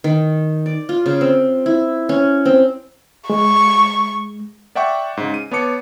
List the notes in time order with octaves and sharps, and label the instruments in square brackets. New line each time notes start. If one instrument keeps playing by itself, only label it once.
[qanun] D#3
D5
F4
C#3
C4
E4
C#4
C4
[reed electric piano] G#3 [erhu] C#6
[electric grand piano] D5 E5 F#5 G5 C#6 D6
G#2 C#3
D#7
B3 C#5 A5 D6 C#7